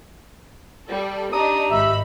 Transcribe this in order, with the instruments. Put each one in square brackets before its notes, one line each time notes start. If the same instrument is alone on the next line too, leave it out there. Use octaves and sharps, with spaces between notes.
[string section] G3 A4
[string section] D4 D#4 [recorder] G4 [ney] A#5 [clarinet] D#6
[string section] G#1 D#4 B5 [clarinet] E5